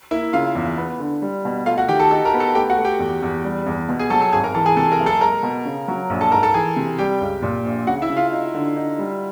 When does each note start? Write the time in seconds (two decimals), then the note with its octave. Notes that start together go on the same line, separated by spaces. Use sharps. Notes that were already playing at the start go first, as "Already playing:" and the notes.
0.11 A#3 E4 E5
0.33 C#3 F4 F5
0.55 E2
0.77 B3
0.99 D3
1.22 G3
1.45 B2
1.66 A3 F4 F5
1.78 F#4 F#5
1.89 D#3 G4 G5
2.00 A4 A5
2.11 D#4 A4 A5
2.25 A#4 A#5
2.34 B3
2.40 A4 A5
2.55 A3 G4 G5
2.70 F#4 F#5
2.78 A3
2.85 G4 G5
2.99 E2
3.22 E2
3.44 G3
3.66 E2
3.89 B2
3.99 G#4 G#5
4.10 F#3 A4 A5
4.21 A4 A5
4.32 G#1 G#4 G#5
4.44 A#4 A#5
4.54 E3 A4 A5
4.66 G#4 G#5
4.76 C3 A4 A5
4.92 A#4 A#5
5.00 F#1
5.06 A4 A5
5.21 G#3 A#4 A#5
5.43 B2
5.65 C#3
5.88 F#3
6.10 A#1
6.21 A4 A5
6.32 G#2 A#4 A#5
6.43 A4 A5
6.54 E3 G#4 G#5
6.76 C3
6.99 G3 G4 G5
7.21 C#2
7.42 A#2
7.64 A#1
7.87 C#3 F#4 F#5
8.02 E4 E5
8.10 C#3
8.16 F4 F5
8.32 D#4
8.54 D3
8.76 D#4
8.99 G3